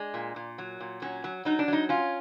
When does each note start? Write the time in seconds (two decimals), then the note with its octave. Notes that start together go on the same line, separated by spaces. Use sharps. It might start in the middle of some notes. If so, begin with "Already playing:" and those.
Already playing: G#3 D4
0.14 A#2
0.36 A#2
0.58 F#3
0.81 A#2
1.02 F#3 C#4
1.24 F#3
1.45 F#3 D#4
1.59 D4
1.68 F#3 D#4
1.89 C#4 F4